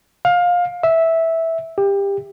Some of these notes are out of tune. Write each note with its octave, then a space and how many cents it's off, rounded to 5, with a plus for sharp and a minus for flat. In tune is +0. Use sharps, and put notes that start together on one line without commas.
F5 +20
E5 -10
G4 +25